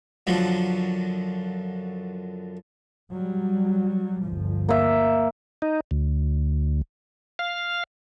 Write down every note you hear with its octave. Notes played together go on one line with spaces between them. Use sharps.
F#2 D3 F3 F#3
F#3 G3
G1 D2 F3
A#3 E5
D#4
D2
F5